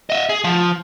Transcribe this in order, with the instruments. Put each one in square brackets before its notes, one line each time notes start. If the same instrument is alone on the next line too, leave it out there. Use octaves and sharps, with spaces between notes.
[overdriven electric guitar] D#5 E5
G#4
F3